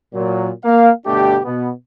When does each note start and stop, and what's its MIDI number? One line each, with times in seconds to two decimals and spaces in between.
0.14 0.50 46
0.14 0.50 54
0.64 0.90 58
0.64 0.90 77
1.06 1.38 31
1.06 1.38 47
1.06 1.38 57
1.06 1.38 62
1.06 1.38 67
1.44 1.69 47
1.44 1.69 59